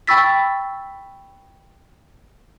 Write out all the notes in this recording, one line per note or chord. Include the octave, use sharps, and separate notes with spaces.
G5 B5 C#6 E6 A6 B6